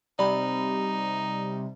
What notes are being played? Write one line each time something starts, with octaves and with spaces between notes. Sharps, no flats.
C3 G3 D#4 D5 B5